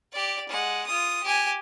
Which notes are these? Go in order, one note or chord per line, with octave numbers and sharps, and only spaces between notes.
G4 D5
G#3 F#5
F4 D#6
G4 G#5